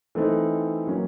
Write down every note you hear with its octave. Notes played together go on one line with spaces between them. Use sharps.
E3 A3 C4 D#4
F#3 A#3 C#4